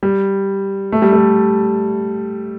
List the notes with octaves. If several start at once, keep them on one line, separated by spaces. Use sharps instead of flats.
G3
A3
G3
A3